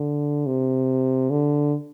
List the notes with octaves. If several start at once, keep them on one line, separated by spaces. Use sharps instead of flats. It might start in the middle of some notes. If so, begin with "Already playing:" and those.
Already playing: D3
C3
D3